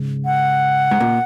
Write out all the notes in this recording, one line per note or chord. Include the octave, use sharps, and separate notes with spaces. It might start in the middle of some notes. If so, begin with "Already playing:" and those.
Already playing: G#2 C#3
F#5
G#2
A#2